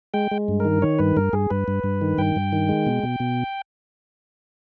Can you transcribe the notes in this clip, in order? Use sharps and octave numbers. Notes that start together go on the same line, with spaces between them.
G#3 G5
G#3
G2
D#3 A#4
D#3 C#5
G2 B4
G2 A#4
G2 G#4
G2 B4
G2
G2
D#3
G2 G5
G2
D#3
G#3
B2
B2
B2